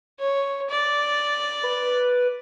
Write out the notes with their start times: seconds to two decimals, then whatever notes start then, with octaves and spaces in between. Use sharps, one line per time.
0.20 C#5
0.70 D5
1.63 B4